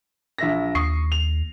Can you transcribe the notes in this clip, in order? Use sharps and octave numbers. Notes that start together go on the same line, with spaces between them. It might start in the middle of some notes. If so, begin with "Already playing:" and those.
A#1 E5 A#6
D#2 C#6 D#6 C7
F7